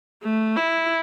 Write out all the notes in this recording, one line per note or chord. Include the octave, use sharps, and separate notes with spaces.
A3
E4